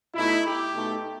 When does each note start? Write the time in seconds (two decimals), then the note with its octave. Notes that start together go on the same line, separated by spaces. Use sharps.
0.14 B2 A3 D#4 E4
0.45 G4
0.74 B2 A3 D#4